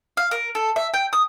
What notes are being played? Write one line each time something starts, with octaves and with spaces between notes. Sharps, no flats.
F5
A#4
A4
E5
G5
D#6